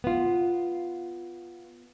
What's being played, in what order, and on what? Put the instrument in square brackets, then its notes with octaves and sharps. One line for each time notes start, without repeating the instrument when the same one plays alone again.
[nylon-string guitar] B3 F4